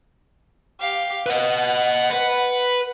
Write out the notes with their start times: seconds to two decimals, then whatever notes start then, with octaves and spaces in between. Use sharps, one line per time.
0.80 G4 F5
1.26 B4 D#5 F#5
2.11 B4